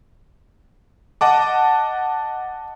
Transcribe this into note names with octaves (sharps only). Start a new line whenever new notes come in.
D#5 F#5 A5 D6